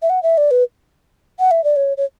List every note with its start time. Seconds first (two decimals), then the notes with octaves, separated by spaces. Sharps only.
0.02 E5
0.09 F#5
0.23 E5
0.37 D5
0.51 B4
1.39 F#5
1.51 E5
1.64 D5
1.76 C#5
1.97 C#5